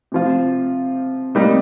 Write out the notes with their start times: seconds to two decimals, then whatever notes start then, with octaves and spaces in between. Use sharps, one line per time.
0.12 C3 F3 C4 F4
1.35 C3 G3 A#3 D#4